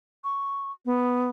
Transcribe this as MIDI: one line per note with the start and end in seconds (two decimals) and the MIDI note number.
0.24 0.72 85
0.85 1.30 59